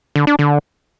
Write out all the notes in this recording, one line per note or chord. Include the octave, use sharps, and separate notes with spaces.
D3
D4
D3